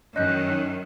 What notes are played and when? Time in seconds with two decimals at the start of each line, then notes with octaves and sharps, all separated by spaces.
0.16 F#2 D#3 C#4 D#5 F#6 G6